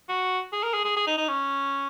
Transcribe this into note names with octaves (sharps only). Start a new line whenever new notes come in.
F#4
G#4
A#4
G#4
G#4
G#4
D#4
D#4
C#4